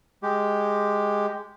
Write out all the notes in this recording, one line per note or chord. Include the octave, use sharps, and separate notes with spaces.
G#3 G4